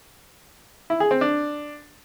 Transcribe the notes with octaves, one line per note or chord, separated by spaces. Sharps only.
E4
G#4
C4
D4